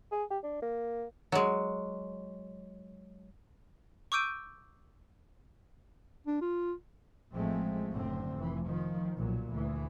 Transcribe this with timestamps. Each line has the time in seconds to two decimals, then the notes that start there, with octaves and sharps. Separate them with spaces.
0.12 G#4
0.30 G4
0.43 D4
0.62 A#3
1.32 F#3 G#3
4.12 C#6 D6 E6 G6 D7 D#7
6.27 D4
6.41 F4
7.34 A1 F3 G#3 A3 C4
7.95 F#1 A2 D3 C4
8.36 F1 E3
8.68 D#3 F3
9.15 B1 A#2 F#3
9.49 D2 E3